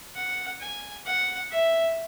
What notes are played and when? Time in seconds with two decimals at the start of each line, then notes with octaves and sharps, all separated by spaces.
0.16 F#5
0.61 G#5
1.06 F#5
1.51 E5